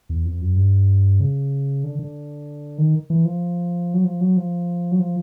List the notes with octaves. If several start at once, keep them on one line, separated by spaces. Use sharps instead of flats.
E2
F2
F#2
G2
C#3
D3
D3
D#3
E3
F3
F#3
F3
F#3
F3
F#3
F3